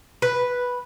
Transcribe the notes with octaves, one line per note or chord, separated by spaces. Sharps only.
B4